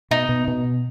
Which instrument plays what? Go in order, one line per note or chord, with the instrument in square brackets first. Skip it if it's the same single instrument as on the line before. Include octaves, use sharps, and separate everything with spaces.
[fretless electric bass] B2 [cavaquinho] D#4
[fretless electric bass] B2
B2